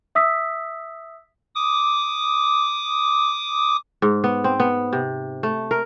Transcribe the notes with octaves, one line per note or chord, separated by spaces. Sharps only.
E5 D#6 E6 B6
D6 D#6
G#2
B3
C4
B3
C3
A3
A#4